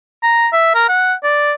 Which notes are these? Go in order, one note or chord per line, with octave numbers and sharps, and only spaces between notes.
A#5
E5
A#4
F#5
D5